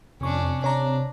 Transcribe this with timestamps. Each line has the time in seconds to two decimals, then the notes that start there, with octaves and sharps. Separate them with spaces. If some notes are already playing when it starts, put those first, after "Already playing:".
0.21 F2 C3 C#4 D4 C#6
0.64 C3 D4 C#5 A#5